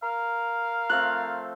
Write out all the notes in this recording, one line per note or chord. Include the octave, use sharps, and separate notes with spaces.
A#4 F5
F3 A3 C4 F#6